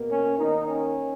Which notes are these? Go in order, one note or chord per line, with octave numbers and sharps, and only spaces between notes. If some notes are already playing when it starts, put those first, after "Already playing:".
Already playing: B2 A#3
C#4
D#3 A#3 D#4
C#4